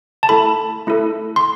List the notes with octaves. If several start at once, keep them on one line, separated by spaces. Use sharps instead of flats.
A5
A3 E4 A4 B5
A3 E4 A4
C6